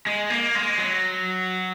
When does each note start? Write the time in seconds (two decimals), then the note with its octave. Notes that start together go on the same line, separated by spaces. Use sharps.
0.07 G#3
0.30 A#3
0.55 G#3
0.78 F#3